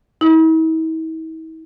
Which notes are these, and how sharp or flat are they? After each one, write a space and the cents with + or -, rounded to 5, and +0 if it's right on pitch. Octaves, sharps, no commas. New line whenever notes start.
E4 -45